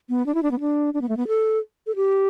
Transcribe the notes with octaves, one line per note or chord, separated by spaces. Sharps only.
B3
D4
E4
D4
B3
D4
D4
B3
A3
B3
A4
A4
G4